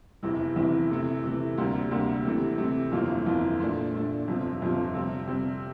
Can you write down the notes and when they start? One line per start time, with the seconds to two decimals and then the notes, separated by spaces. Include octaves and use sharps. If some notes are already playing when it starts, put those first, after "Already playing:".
0.23 F1 E2 C3 E3
0.56 F1 E2 C3 E3
0.90 C3 E3 A3
1.24 C3 E3 A3
1.57 D2 C3 G3 A#3 D4
1.91 D2 C3 G3 A#3 D4
2.25 C3 E3 A3 C4
2.58 C3 E3 A3 C4
2.92 G1 F2 E3 A#3 F4
3.26 G1 F2 E3 A#3 F4
3.60 A#2 A3 D4
3.93 A#2 A3 D4
4.27 G1 F2 C3 F3
4.61 G1 F2 C3 F3
4.94 C3 G3 C4
5.28 C3 G3 C4